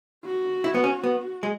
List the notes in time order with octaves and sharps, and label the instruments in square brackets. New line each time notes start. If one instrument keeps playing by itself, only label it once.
[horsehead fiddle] F#4
[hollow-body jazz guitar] E4
B3
C#4
B3
G#3